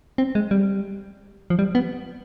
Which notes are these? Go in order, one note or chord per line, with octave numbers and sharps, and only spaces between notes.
C4
G#3
G3
F3
G3
B3